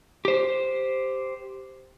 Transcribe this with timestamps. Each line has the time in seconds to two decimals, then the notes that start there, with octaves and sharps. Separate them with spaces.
0.25 G4 C5